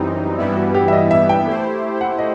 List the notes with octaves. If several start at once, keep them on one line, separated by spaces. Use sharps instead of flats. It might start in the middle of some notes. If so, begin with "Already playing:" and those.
Already playing: F#2 E3 G3 C4 D#4 E4
G2 E3 G3 B3 E4
F#4
G4
E5
D#5
E5
G5
A3 E4 G4 C5
F#5
D#5